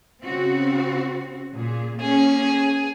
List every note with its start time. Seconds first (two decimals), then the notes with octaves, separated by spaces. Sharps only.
0.22 C#3 C4 F#4
1.54 A#2 G#4
2.00 A#3 C#4 G#4